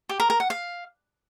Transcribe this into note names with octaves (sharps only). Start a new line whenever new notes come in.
G4
A#4
A#4
F#5
F5